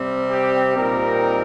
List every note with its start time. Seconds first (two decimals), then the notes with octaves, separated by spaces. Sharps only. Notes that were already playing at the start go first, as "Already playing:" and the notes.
Already playing: C3 G3 C4
0.30 G4
0.76 A#2 G3 C4 D#4 A#4